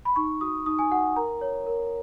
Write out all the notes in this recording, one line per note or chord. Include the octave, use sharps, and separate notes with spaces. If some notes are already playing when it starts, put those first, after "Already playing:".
B5
D#4 C#6
F#4 D#6
D#4 D#6
G#5
F#4 F#5
A#4 A#5
C#5
A#4